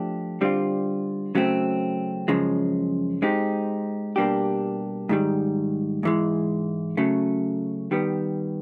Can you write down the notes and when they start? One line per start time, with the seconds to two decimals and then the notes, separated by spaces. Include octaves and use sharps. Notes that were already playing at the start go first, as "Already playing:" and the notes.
Already playing: F3 A3 D4 G4
0.41 D3 G3 C4 F4
1.35 C#3 F#3 A3 C4
2.28 F#2 C#3 F3 G#3
3.22 G#3 C4 D#4 G4
4.16 B2 G3 A#3 D4 G4
5.09 G#2 D#3 G3
6.03 G#2 E3 G#3
6.97 C#3 F#3 A3
7.91 D#3 G3 B3